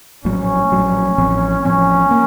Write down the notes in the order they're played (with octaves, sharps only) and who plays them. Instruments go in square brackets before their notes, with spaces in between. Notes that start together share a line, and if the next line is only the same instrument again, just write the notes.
[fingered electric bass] A#1 A2 F#3 [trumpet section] C#4
[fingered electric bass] A#1 A2 F#3
A1 A2 F3 C4
[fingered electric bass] A1 A2 F3 C4 [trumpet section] C#4
[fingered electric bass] A#3